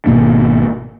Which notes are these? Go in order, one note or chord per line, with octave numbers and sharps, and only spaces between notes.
G#1 B2 A#3 D4